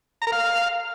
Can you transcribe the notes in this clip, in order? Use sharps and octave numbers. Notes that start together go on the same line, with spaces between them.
A#5
A#4
F5